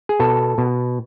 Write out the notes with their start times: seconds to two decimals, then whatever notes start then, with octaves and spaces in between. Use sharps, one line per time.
0.09 G#4
0.20 B2 A4
0.58 B2